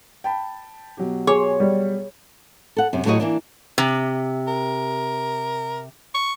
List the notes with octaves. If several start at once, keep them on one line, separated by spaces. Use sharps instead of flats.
G5 A5 B5
B2 F#3 G4
G#4 C#5 G#5 C6
G3
A4 F#5
F#2 C3
A2 F#3 F#4 G4 C#5 D#5
E3 A#3 D4
C3
A#4
C#6